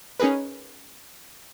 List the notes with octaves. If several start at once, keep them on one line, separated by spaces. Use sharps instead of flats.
C#4 D#4 G#4 A#4 B4